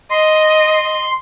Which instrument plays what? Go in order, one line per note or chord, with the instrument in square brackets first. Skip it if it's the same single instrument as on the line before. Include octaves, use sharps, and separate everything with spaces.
[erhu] D#5 [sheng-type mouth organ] C6